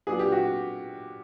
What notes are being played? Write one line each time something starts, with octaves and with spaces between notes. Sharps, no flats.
A#2 F#3 B3 D4 G#4
G4
F#4